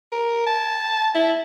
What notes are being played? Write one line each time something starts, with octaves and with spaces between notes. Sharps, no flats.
A#4
A5
E4